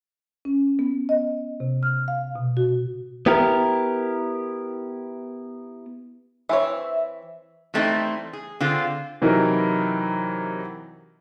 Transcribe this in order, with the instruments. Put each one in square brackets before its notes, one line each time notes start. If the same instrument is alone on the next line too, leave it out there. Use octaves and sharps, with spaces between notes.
[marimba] C#4
B3
D#5
C3
F6
F5
B2
F#4
[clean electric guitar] B3 E4 G4 A#4
[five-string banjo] E3 C4 C#5 [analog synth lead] E5
[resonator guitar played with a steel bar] E3 G3 A3 C4 D#4
G#4
D3 C4 F4 G#4
[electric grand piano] C3 E3 F#3 D#4 E4 A#4